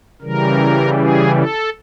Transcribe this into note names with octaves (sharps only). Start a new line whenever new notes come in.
C#3 E3 G3 A#4
G#4
A4